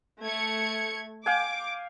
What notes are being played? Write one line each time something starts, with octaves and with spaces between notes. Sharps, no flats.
A3 G#6 C#7
F5 G5 G#5 D6